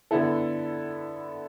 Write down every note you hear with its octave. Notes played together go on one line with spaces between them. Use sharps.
D3 B3 E4 A4